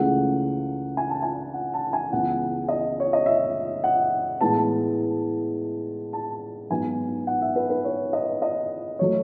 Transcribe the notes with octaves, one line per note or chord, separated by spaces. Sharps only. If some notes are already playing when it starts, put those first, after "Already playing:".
Already playing: C#2 C#3 E3 A3 F#5
G#5
A5
G#5
F#5
A5
G#5
C#2 C#3 E3 G#3 B3 F#5
D#5
C#5
D#5
E5
F#5
A2 E3 G#3 B3 A5
A5
G#2 F#3 B3 G#5
F#5
E5
B4
B4
C#5
D#5
D#5
F#3 A3 C#5